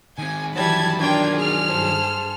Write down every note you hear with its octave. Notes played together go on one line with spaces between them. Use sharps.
D#3 C4 G#5
D#3 E3 F#3 G3 A5 B5 G#6
D4 F4 A#4 G5 G#6
G#4 F6
G2 A4 C5